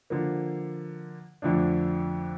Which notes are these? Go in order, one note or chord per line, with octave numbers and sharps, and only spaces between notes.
D3 F3 A#3
F2 D3 F3 A3 D4